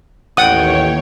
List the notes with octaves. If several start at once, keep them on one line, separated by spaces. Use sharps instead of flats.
A1 D#2 C#5 F#5 G5 D#6